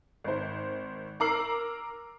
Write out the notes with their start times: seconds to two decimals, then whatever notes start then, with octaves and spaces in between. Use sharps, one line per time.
0.24 G#1 C5
1.20 A#4 A#5 D6 E6 C7 F#7